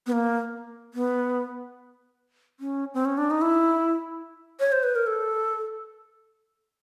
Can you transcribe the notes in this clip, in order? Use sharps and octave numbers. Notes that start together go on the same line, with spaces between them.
B3
A#3
B3
C#4
C4
C#4
D4
D#4
E4
C#5
C5
B4
A#4
A4